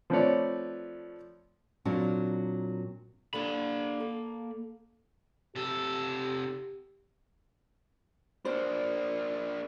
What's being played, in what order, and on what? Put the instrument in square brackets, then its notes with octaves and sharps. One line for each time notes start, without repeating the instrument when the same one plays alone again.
[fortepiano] F3 A3 C4 B4 C#5 D5
[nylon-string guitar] A#2 F#3 C4 D4 A#4
[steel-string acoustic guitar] D3 D4 G4 [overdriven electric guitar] A#3 B5
[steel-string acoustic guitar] A4
[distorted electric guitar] C3 A4 [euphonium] G4
[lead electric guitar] A#3 D4 [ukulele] C5